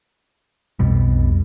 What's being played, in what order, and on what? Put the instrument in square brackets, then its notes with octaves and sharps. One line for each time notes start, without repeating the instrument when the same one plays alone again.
[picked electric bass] B1 F2 B2 G3